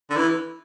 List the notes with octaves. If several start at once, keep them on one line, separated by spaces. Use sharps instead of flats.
D3
E3